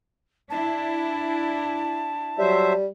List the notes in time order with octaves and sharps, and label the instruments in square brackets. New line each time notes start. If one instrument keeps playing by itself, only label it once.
[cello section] D4 E4 [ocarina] A5
[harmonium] F#3 C5 E5 [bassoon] G3